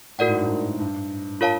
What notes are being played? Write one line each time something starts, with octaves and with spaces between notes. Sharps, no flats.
A2 F#4 A#4 D5 F#5
G#2
G2
G#2
G2
F4 A#4 C#5 F5 A5